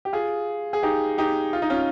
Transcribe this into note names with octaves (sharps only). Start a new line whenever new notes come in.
G4
F4 G#4
G#4
D#4 G4
D#4 G4
F4
D#4
C#4 F4